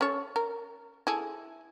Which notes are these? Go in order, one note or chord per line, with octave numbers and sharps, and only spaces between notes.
C#4 A4 C#5
A#4
E4 G#4 A4